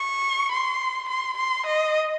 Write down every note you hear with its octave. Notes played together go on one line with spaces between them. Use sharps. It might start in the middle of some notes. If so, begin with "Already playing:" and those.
Already playing: C#6
C6
C6
C6
D#5